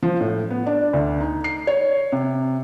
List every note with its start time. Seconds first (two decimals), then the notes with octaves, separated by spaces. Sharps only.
0.03 F3
0.20 A2
0.50 B3
0.67 D4
0.93 D2
1.20 D#4
1.44 C7
1.67 C#5
2.12 C3